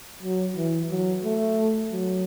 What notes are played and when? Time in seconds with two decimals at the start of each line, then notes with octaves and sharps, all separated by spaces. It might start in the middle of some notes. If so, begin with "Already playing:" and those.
0.23 F#3
0.57 E3
0.91 F#3
1.24 A3
1.92 F#3